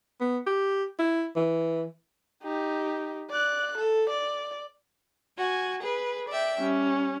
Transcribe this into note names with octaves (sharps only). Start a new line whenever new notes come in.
B3
G4
E4
E3
D#4 G4
D5 F#6
A4
D5
F#4 G#5
G#4 B4
D5 E5 G5
G3 C#4